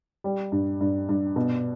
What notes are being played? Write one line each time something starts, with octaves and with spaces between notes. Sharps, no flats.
G3
G2
G2
G2
B2